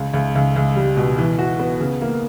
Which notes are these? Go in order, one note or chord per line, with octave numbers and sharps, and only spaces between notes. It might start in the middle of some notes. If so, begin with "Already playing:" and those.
Already playing: C#2
C#2
C#2
C#2
G3
B2
E3
F#4
B3
C#3
A#3